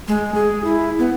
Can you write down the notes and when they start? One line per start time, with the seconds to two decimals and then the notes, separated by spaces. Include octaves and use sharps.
0.08 G#3
0.35 G#4
0.64 E4
0.99 B3